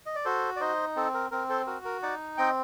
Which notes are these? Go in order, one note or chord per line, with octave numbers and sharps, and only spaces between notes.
D#5
D5
F#4 A4 C5
D5
D#4 C5 D#5
C4 A4
A#4
C4 A#4
A4 C5
F#4 A#4
A#4
D#4 D5 F#5
C4 D#5 G5